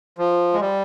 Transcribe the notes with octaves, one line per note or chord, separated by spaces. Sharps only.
F3
G#3
G3